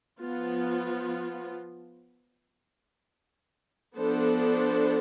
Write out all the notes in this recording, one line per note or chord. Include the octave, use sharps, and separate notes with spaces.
F3 B3 F4
F3 B3 D4 A4 C5